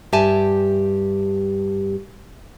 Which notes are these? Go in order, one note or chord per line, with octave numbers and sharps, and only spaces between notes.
G2 G4 E5 G#5 A5